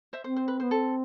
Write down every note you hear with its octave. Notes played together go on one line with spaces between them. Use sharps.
C5 E5
C4 C5
C5
B4
B3 C5
C4 A4